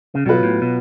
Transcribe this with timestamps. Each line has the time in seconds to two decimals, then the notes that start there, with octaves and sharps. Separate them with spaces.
0.15 C#3
0.25 B2 F#3 B3 F4 B4
0.43 A2
0.62 B2